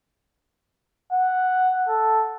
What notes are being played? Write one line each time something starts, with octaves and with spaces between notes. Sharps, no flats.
F#5
A4